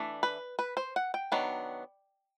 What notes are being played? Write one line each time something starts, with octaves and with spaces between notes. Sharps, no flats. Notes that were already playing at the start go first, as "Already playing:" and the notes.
Already playing: E3 A3 D4
B4
B4
C5
F#5
G5
D#3 F#3 B3 D4